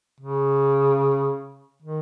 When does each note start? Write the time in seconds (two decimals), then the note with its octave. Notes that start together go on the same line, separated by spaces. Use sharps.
0.20 C#3
1.82 D#3